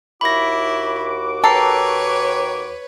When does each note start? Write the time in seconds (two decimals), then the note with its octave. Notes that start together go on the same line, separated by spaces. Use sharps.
0.21 D#2 E4 F#4 B5 D6 A#6
1.44 A4 B4 C#5 G5 A#5 C7